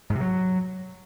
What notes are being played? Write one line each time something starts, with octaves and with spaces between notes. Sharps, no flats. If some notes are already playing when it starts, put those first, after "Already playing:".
G#2
C3
F#3